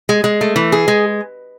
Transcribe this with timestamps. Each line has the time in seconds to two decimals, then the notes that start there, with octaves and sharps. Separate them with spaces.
0.09 G#3
0.24 G#3
0.41 A3
0.56 E3
0.72 G#4
0.88 G#3